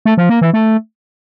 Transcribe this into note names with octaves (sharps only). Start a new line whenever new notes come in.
A3
F3
A#3
E3
A3